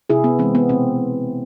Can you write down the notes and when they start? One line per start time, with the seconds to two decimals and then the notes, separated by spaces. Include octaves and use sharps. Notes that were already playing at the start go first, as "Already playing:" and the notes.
0.10 C3 E4 G#4
0.24 B3
0.39 E3 G#3 C4
0.55 B3
0.69 B2 C4